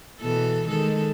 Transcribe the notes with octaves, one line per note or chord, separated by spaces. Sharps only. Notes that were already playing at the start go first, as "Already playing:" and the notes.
B2 E3 A4
D#3 G#3 A4